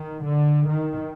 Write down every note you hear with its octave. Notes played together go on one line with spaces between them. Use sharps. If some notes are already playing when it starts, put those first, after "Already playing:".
Already playing: D#3
D3
D#3